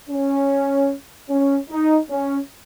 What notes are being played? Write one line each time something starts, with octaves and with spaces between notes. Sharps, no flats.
C#4
C#4
D#4
C#4